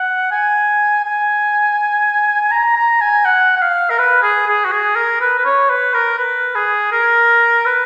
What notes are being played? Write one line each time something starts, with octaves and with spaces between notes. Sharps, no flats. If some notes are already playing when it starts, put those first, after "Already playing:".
Already playing: F#5
G#5
G#5
A#5
A#5
G#5
F#5
F#5
F5
A#4
B4
G#4
G#4
F#4
G#4
A#4
B4
B4
C#5
B4
A#4
B4
G#4
A#4
B4